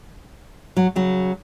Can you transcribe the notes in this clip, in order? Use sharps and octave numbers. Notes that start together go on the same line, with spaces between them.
F#3
C#3 F#3